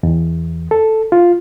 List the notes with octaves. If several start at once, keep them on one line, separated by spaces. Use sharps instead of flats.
E2
A4
F4